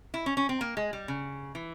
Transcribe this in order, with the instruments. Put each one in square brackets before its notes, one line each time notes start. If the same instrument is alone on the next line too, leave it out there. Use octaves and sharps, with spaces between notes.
[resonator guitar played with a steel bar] E4
C#4
C#4
C4
A#3
G#3
G3
C#3
E3